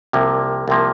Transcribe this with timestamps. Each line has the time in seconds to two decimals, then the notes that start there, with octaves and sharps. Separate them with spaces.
0.13 C2 C3 F3 A#3
0.68 C2 C3 F3 A#3